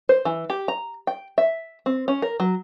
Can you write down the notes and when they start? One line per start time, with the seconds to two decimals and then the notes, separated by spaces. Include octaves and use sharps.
0.09 C5
0.25 E3
0.50 G4
0.68 A#5
1.07 G5
1.38 E5
1.86 C4
2.08 C#4
2.22 A#4
2.40 F#3